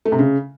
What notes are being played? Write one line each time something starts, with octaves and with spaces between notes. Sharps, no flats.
A3
C3
C#3